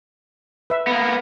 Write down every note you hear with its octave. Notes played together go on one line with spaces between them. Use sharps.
B4 E5
A#3 B3